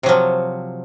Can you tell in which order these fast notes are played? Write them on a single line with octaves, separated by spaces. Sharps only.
C3 F#3 F3